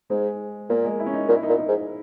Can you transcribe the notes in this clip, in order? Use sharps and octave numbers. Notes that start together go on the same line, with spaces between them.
G#2 G#3
A#2 A#3
G#3
E4
C#4
D#4
A#2 D#4
E4
D#4
A#2
D#4
G#2